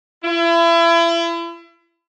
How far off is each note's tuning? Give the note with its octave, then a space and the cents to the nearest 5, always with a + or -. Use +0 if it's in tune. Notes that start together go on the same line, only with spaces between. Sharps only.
E4 +35